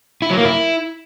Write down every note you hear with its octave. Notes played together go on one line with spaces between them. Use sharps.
E4
F#3
A#3
E4